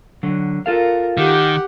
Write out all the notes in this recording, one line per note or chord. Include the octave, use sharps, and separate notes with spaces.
D3 F#3
F4 A4 A#4 F5
D#3 G4 F#5